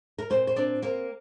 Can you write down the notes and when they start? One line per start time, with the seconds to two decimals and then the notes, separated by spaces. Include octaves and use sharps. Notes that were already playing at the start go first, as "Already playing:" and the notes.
0.18 A#4
0.30 A#2 C4 C5
0.47 C5
0.56 C4 D4 D5
0.82 A#3 C4 A#4